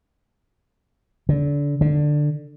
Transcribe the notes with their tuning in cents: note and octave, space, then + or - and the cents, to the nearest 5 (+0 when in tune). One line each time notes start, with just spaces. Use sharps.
D3 -30
D3 +10